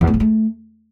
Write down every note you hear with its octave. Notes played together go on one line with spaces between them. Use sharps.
E2
A2
F3
A3